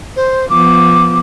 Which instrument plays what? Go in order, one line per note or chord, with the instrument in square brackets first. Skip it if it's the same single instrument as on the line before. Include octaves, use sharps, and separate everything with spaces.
[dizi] C5
[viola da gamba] F3 B3 [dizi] D6